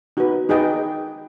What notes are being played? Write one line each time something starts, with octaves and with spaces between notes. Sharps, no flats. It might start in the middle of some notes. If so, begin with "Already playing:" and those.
D#4 F#4 B4
D#4 G#4 B4 D#5 G5